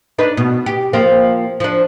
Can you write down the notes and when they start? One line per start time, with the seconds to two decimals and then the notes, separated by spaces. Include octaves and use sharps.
0.18 D4 D#4 B4
0.37 B2
0.66 G4
0.93 F3 A#3 C4
1.60 F3 D4